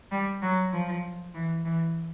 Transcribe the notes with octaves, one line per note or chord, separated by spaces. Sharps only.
G3
F#3
F3
E3
E3